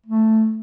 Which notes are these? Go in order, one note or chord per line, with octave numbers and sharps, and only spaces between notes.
A3